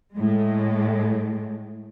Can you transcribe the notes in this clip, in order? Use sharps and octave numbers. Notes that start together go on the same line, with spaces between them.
A2 G#3